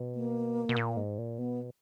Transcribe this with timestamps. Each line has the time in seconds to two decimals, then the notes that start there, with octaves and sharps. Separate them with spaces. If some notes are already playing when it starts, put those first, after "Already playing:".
Already playing: B2
0.15 A#3
0.69 B2
0.76 A#2
0.97 G#2
1.18 A#2
1.38 B2 B3